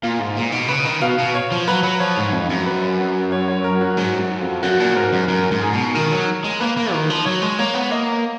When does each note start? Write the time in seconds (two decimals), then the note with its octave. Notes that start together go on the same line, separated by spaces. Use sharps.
0.03 A#2 F5
0.20 G#2
0.37 A#2
0.52 B2
0.68 C#3 B4
0.85 D#3
1.02 B2 F5
1.19 B2
1.34 C#5
1.52 F3
1.67 F#3 B4
1.83 F#3
2.00 F3 C#5
2.17 G#2
2.33 F2
2.49 F#2
2.66 B4
3.32 C#5
3.48 C#5
3.64 A#4
3.81 F#4
3.97 G#2
4.19 F#2
4.41 F2
4.63 F#2 F#4
4.80 A#2
4.96 G#2 A#4
5.13 F#2
5.28 F#2 A#4
5.51 G#2
5.62 G#4
5.73 B2
5.94 D#3 A#4
6.12 F#3
6.44 G#3
6.60 A#3 B4
6.77 A#3
6.93 D#3
7.10 F3
7.26 F#3 C#5
7.42 G#3
7.59 A#3 C#5
7.75 B3
7.91 A#3 D#5